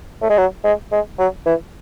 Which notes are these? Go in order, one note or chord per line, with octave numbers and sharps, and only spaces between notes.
A3
G#3
F#3
G#3
G#3
F#3
E3